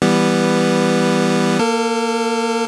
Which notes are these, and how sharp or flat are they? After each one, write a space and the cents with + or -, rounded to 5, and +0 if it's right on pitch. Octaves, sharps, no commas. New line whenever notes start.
E3 +0 G3 +10 B3 +0
A#3 +0 A4 +35